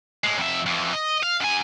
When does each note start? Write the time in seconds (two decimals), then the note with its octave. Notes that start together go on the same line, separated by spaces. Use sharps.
0.24 A2 G#3
0.38 F2 E5
0.66 F2 E3
0.93 D#5
1.23 F5
1.41 F#2 G#5